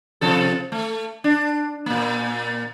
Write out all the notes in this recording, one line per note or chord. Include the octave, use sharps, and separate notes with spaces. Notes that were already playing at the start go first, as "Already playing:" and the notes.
C3 F3 A4
A3
D4
A#2 A#3